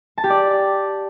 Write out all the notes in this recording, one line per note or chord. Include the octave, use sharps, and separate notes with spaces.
A5
G4
D5